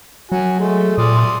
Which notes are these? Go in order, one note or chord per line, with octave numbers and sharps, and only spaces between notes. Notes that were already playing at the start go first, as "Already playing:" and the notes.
F#3 F#4 G#5
G#3 A3
A#2 D5 C6 D#6